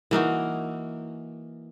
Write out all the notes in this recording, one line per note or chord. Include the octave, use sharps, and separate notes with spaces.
E3 A#3 D#4 F#4